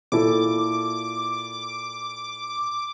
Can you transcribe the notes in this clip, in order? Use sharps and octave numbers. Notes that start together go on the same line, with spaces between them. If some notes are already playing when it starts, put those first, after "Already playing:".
A#2 E4 A4 D6